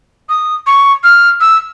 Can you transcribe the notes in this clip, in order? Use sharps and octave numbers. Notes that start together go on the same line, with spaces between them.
D#6
C#6
F6
E6